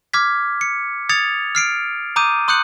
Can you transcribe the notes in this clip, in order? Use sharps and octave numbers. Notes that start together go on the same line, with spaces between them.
D6 F6 G#6 B6
C#7
D#6 G#6 A6 C#7 F7
F6 C7 D7
A#5 D6 D#6 G6 D#7
C6 D#6 F#6 G6 C#7 F#7